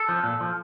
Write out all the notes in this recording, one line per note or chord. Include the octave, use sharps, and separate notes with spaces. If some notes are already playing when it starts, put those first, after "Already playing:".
Already playing: A4
F3
A#2
F3